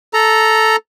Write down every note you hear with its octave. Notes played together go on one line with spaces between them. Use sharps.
A4 A#5